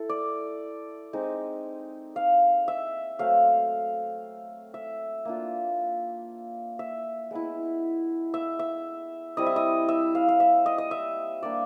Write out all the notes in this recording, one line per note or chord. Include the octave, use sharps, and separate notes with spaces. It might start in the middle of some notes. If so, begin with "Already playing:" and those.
Already playing: E4 A4
D5
G#3 C4 D#4
F5
E5
F#3 A3 C4 F5
E5
A#3 D4 F4
E5
G#3 B3 E4
E5
E5
G3 C4 E4 D#5
E5
D#5
E5
F5
F5
E5
D#5
D#5
E5
G3 A#3 D4 D5